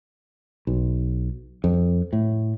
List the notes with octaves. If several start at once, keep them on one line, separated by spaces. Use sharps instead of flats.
B1
F2
A2